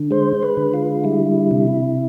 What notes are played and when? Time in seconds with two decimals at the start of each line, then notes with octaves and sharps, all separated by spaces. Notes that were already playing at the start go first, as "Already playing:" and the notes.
Already playing: D3
0.11 G#3 C5
0.43 B4
0.57 D3
0.74 F4
1.04 G3 E4
1.51 C3